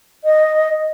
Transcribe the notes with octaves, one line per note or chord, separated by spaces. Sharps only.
D#5